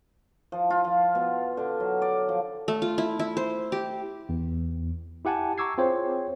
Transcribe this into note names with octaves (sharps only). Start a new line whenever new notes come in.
F3
F4
F3
B2
D3
F#3
D5
F3
A3
F4
E4
E4
C5
G4
E2
E4 G4 F#5 G#5 A5
A#5 C#6 D6 E6 G#6 C7
C4 F4 G#4 C5 C#5